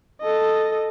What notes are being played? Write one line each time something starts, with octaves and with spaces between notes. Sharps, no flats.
A4 D#5